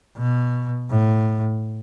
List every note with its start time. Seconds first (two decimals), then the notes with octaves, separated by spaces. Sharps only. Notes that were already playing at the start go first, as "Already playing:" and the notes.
0.18 B2
0.90 A2